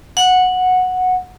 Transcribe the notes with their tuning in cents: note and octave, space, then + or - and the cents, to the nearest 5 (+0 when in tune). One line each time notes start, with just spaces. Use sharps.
F#5 -10